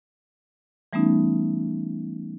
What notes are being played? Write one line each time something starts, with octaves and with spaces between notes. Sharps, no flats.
E3 G3 A3 B3 C#4 D#4